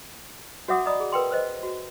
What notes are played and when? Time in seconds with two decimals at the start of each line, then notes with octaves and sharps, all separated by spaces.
0.68 F#4 C#5 E5 F#5 D6 D#6
0.86 D5 D#5 A#5 B5 D#6
1.00 G#4
1.12 A#4 B4 G5 C6
1.31 B4 C5 D#5
1.63 F#4